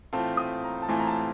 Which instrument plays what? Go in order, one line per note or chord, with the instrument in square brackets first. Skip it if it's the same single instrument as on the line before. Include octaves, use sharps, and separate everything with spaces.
[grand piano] A2 E3 A3 C4 F4 [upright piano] A5
[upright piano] D#6
A#5
A5
[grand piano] A2 E3 A3 C4 F4 [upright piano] G#5
[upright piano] A#5
A5